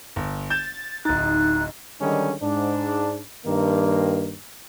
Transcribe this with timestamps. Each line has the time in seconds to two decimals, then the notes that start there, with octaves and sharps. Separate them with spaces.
0.16 G1
0.50 G6 A6 E7
1.05 D1 D#4 F#6 A6
2.01 D3 D#3 G3 G#3 C#4 D#4
2.42 G#2 D4
3.45 G2 D#3 A#3